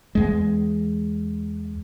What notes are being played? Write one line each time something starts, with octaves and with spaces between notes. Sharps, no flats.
E2 G#3